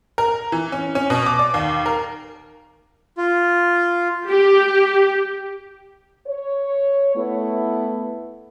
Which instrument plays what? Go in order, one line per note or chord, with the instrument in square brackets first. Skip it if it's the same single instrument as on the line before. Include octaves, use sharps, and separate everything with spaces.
[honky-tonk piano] A#4
E3
C#4
C#4
B2
D6
D5
D#2
A#4
[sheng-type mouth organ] F4
[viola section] G4
[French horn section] C#5
A3 B3 E4